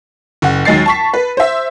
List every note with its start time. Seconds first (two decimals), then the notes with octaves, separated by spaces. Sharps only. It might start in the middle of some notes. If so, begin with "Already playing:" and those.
0.42 F#1 F#5
0.65 D#2 F#3 G#3 A6 C7
0.86 A5 C#6 B6
1.14 B4
1.37 C5 E5